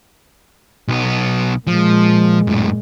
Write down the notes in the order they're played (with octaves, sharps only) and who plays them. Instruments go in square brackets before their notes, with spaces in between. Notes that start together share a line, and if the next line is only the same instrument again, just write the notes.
[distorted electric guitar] B1 B3
[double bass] A#2 G#3 [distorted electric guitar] F3
[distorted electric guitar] F#2 A2